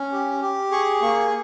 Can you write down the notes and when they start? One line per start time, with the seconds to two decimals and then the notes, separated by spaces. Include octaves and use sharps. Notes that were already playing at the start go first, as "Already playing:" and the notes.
Already playing: C#4
0.12 G4
0.41 G4
0.71 G#4 C#6
1.01 A#3 C#6